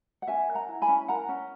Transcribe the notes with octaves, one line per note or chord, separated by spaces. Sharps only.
F#5
C#4 E5 G#5
A#4
F#5 A#5
E4
G#5 B5
C#4
A#4 F#5 A#5
C#4